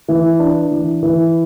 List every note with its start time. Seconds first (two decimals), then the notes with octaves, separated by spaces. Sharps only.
0.08 E3
0.40 D4
0.71 E3
1.03 E3